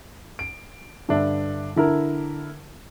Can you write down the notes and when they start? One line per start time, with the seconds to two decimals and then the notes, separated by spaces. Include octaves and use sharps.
0.39 D7
1.09 G2 D3 D4 E5
1.76 D3 E4 A#4